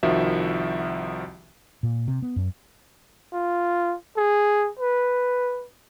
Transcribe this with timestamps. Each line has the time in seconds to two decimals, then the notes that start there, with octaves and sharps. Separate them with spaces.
0.03 C2 D#3 F3 F#4 E5
1.83 A#2
2.08 C3
2.22 B3
2.36 F#2
3.33 F4
4.17 G#4
4.79 B4